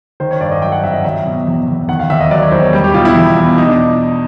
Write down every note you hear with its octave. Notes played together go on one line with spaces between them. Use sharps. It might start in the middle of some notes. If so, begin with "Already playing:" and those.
D#3 C5
C#5
G2 D5
D#5
F#3 G5
F#5
G#1 E5
D#5
F#3 E5
B2
E2
E2
D#3 F#5
F5
D#2 E5
D#5
F#3 D5
C#5
E1 C5
C#5
G3
G4
B2 F4
E4
E2
E2
B2 D#4
D4